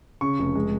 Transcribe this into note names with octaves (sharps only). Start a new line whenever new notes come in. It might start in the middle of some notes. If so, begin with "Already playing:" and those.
C#3 C#6
F1
G#3